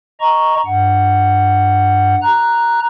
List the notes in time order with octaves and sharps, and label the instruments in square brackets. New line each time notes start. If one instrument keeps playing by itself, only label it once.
[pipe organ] D#5 A#5 C#6
G2 F#5
A#5 F#6